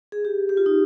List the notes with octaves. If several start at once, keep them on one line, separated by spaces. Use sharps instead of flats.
G#4
G4
G4
F4
D#4